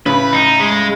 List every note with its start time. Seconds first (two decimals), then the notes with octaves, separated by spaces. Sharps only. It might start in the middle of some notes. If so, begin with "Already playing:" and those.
0.06 A2 C#3 B4
0.33 D#4
0.60 G#3